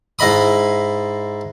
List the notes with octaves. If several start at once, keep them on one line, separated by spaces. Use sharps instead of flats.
G#2 E4 D#5 B5 D#6